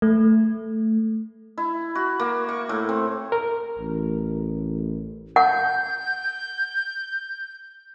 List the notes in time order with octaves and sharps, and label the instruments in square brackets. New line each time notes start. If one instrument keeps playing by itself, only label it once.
[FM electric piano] A3
[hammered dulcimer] E4
F#4
A#3
C#6
A2
C4
[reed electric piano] A#4
[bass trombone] A1
[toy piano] F#5 [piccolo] G6